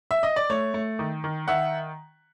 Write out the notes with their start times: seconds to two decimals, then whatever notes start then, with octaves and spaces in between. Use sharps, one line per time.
0.11 E5
0.23 D#5
0.36 D5
0.50 A3 C#5
0.74 A3
0.99 D#3
1.24 D#3
1.48 D#3 E5 F#5